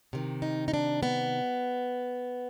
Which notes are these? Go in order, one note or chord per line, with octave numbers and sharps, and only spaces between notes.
C3 D#3
D#4
D#4
D4
B3